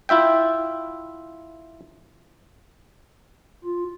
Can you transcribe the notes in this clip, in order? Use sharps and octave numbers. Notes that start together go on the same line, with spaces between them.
E4 F4 E5 G5
F4